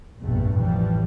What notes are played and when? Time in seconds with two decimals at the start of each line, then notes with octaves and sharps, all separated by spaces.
0.19 F1 A#1 G2 B2 A3
0.54 A1 E3 F3 G3